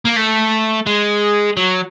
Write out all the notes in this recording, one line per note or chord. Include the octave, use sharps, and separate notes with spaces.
A#3
A3
G#3
F#3